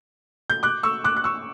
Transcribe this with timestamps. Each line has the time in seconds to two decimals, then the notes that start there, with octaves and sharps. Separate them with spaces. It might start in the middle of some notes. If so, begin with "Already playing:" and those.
0.50 G6
0.63 D6 F#6
0.83 C#6 E6
1.04 D6 F#6
1.17 F#6
1.24 C#6 E6